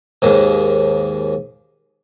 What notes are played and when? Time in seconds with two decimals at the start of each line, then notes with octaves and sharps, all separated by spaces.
0.22 D#2 G#2